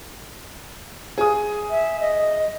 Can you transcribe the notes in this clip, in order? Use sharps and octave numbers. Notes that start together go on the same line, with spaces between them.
G#4 D#6
E5
D#5